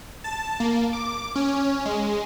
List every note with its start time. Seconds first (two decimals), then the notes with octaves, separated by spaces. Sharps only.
0.24 A5
0.60 A#3
0.93 D6
1.36 C#4
1.85 G#3